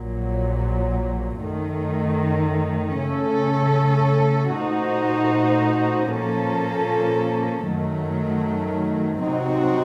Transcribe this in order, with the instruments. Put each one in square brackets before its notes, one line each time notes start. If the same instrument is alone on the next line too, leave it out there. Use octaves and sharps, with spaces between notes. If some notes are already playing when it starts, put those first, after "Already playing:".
Already playing: [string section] A#1 A#2 F#3
F#2 D#3 A3
C#3 A3 C#4 A4
A#2 A3 D#4 F#4 C5
A#2 F3 A#3 C#4 A4
F#2 D#3 F#3 A3
C3 F#3 C4 D#4 F#4